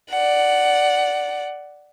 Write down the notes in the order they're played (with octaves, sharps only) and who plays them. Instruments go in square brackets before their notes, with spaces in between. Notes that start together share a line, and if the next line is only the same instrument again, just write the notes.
[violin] D5 F#5